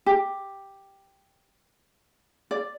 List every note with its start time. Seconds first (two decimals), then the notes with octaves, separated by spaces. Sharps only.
0.06 G4
2.51 D5